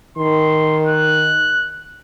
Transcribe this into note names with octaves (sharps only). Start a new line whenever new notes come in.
D#3 C6
F#6